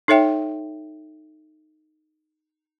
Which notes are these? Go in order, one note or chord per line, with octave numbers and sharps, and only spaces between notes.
D#4 A4 C#5 E5 G5